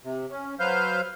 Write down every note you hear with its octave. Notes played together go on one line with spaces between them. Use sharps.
C3
C#4
F#3 B4 C5 F5 F6 G6